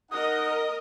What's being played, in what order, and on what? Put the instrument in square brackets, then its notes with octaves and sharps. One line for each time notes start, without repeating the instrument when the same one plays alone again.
[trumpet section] D#4 F#5 [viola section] A#4 D#5 [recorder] D#6